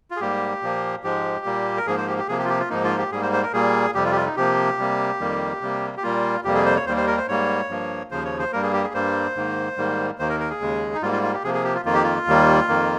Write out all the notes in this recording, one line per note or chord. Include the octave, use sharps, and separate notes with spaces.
F4
G#4
G#2 G3 A#3 G4
A#2 F3 A#3
G#2 F3 G#3 G4
A#2 G3 A#3
A#4
G#2 F3 A#3 G#4
C5
G4
G4
C3 F3 A#3 G#4
G4
F4
G4
F4
G#2 F3 A#3 D#4
F4
G4
G#2 G3 A#3 G#4
C5
C5
A#4
A#2 G3 A#3 G#4
F2 C3 G3 G4
F4
G4
F4
D#4
C3 F3 A#3 G4
C3 G3 A#3
F2 D#3 G3 A#3
C3 G3 A#3
G4
A#2 G3 A#3 F4
F2 C3 G3 A#3 G4
G#4
C5
C#5
D#2 D#3 G3 A#3 C5
C5
A#4
C5
G#2 G3 A#3 C#5
G2 F3 A#3
D#2 C#3 F3 C5
C#5
C5
G2 G3 A#3 A#4
G#4
G4
G#4
G2 G3 A#3 C5
G#2 D#3 A#3
G#2 D#3 G3 A#3
D#2 D#3 A#3 C5
A#4
A#4
G#4
D#2 C#3 G#3
D#4
G#2 G3 A#3 F4
F4
F4
G4
C3 F3 A#3 G#4
G#4
G4
F4
F2 D#3 A#3 F4
G4
F4
D#2 D#3 G3 A#3
F2 D#3 A#3